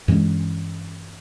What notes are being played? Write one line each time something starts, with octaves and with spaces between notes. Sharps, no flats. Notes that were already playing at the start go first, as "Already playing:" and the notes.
G2 E3 G#3 C#4